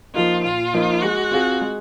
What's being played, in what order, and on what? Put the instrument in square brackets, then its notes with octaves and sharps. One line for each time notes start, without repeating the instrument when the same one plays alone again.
[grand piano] F3 A#3 D#4 [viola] F4
[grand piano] A#2 [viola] F4
[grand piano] F3 A#3 D#4
[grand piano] G#3 [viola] F#4
[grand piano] C4 F4 G#4
G#3